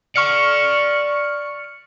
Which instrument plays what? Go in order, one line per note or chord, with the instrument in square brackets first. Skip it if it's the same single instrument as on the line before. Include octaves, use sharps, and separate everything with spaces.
[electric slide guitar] D5 F#5 [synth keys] C#6 F6 C#7